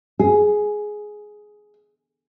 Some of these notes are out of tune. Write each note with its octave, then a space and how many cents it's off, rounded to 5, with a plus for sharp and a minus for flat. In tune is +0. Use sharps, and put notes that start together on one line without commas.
G#4 +10